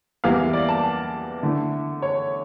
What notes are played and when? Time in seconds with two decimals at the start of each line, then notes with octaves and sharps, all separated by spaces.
0.24 E2 E3 G3 A#3 E4 F5
0.53 D5
0.69 A5
1.43 D3 A3 E4
2.02 C#5